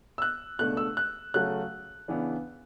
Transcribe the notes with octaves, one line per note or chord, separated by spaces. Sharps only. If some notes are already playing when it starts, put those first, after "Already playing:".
E6
F#6
C#2 B2 A3 D4 F#6
E6
F#6
C#3 F#3 A3 F#6
C#3 E3 B3 D4